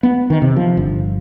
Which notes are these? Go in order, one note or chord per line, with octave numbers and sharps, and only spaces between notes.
B3
D#3
C3
F3
G1